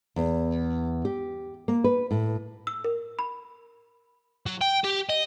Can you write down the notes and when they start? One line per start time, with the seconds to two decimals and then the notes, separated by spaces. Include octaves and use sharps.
0.16 E2
1.05 G4
1.68 A#3
1.84 B4
2.11 A2
2.67 E6
2.84 A#4
3.19 B5
4.46 F#3
4.61 G5
4.84 G4
5.10 D#5